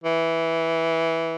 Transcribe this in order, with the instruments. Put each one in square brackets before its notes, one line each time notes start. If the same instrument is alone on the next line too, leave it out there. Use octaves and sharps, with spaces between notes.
[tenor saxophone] E3